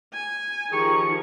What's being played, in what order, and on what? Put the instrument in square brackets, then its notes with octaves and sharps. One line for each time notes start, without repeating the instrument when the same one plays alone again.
[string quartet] G#5
[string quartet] D#3 F3 [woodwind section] G4 G#4 C#6